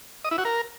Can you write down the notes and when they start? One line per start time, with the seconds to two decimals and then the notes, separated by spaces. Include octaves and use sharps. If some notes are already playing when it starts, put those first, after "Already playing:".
0.24 D#5
0.31 E4
0.38 F#4
0.45 A#4